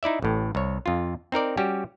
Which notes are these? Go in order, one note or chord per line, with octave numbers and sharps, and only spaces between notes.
D#4 E4 D5 E5
A1 A2
C2 C#5
F2 F4
C4 D#4 A#4 D5
G3 C#4 F#4 G4